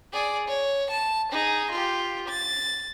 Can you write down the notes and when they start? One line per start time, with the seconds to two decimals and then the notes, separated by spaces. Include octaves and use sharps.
0.12 G#4 D5
0.48 C#5
0.90 A5
1.31 D#4 G#4
1.71 F4 G4
2.28 A6